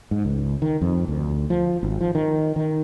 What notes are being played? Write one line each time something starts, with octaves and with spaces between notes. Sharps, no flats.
G#2
C#2
D#3
F2
D2
F3
G#1
F3
D#3
D#3